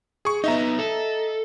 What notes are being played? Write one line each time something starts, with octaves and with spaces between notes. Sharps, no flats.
G#4 C#6
B3 D#4 D#5 E5 A#5
A4